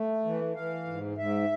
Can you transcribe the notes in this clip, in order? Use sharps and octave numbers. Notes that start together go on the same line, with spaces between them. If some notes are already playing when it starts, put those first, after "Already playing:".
Already playing: A3
E3
E3 F5
G#2
G#2 E5